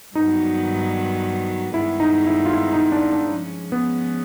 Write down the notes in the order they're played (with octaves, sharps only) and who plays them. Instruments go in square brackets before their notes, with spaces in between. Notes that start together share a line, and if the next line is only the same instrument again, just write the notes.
[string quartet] G2 D#3 F#3 B3 [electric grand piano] D#4
[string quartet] G2 D#3 G#3 B3 [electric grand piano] E4
[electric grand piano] D#4
E4
F4
E4
D#4
D4
D4
[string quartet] F3 G#3 C#4
[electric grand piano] B3